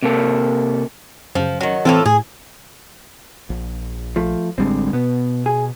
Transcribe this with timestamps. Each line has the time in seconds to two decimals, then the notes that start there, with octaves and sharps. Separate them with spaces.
0.03 C3 A#3 A4
1.35 F#2 C#3 F3
1.61 D#3 F#3
1.85 A2 E3 C4 F4 A4
2.06 A2 G#4
3.50 A#1
4.16 F3 A3
4.58 A1 D3 G3 G#3 C4
4.93 B2 B3
5.46 G#4